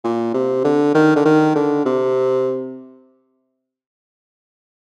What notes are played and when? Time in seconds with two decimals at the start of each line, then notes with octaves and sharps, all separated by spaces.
0.04 A#2
0.34 C3
0.64 D3
0.95 D#3
1.16 D3
1.25 D#3
1.56 D3
1.85 C3